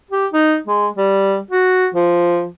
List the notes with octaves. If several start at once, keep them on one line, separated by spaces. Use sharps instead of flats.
G4
D#4
G#3
G3
F#4
F3